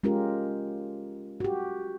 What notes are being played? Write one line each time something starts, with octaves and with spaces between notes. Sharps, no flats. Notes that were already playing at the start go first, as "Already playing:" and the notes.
G#3 C#4 F4 G4 A#4
F#4 G4